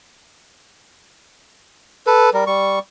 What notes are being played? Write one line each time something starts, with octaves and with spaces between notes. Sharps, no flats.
A4 B4
G3 A#4
G3 C#6